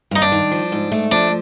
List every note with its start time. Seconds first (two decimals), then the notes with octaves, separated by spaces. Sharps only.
0.11 G2 D#4
0.22 D4
0.32 D#3
0.51 F3
0.72 G#2
0.92 A3
1.12 F3 D4